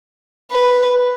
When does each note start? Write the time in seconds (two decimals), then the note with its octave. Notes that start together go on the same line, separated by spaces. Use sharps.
0.51 B4